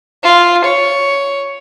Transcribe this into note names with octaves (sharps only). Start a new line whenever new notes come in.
F4
C#5